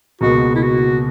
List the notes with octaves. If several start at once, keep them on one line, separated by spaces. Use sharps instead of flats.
C#2 B2 A#3 F#4
E4
F#4